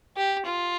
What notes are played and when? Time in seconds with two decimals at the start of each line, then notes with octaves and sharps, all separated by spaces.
0.17 G4
0.46 F4